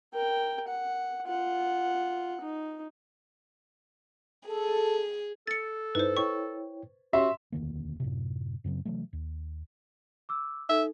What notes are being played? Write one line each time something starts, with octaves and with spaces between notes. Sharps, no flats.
A#4 G5
F#5
F4 F#5
D#4
G#4 A4
A4 A6 C#7
G2 D#4 E4 B4 C5
E4 C#5 G5 C#6
C#4 F#4 G4 C#5 E5 C6
E1 D2 D#3 A#3
F#2 A2 C3
F#2 C#3 F#3 C4
C3 E3 F#3 A3
D#2
D6 E6
D#4 A4 E5